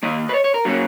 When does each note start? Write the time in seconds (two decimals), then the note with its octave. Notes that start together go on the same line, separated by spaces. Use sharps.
0.03 D#2 D#3 A#3 D#5
0.29 B4
0.34 C#5
0.44 C#5
0.54 A#4
0.65 F#3 A#3 C#4 F#4